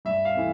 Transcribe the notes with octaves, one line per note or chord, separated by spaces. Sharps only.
G2 E5
F5
E3 A3 C4